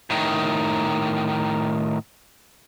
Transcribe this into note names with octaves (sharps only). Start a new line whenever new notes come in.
A2 D#3